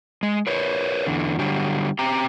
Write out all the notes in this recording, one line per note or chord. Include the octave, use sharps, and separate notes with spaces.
G#3
A#4 B4 C#5
E2 D3
D3 F#3 G3
C4 G4 G5 A#5